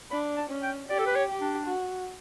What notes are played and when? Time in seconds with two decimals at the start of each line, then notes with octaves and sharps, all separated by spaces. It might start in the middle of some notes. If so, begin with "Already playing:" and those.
0.11 D4 B5
0.36 A5
0.50 C#4
0.63 G5
0.89 G4 D5
0.99 A4
1.06 B4
1.15 C#5
1.28 G4
1.41 D4
1.67 F#4